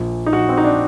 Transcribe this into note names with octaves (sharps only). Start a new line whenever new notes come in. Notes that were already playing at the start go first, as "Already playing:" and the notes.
Already playing: A#1 A#2
D#4
A#1 A#2 F#4
C4
D#4
D4